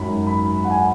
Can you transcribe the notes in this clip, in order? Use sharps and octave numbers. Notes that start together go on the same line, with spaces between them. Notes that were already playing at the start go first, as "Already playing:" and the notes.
Already playing: G#1 F#2 F#3 B5
B5
F#5
G#5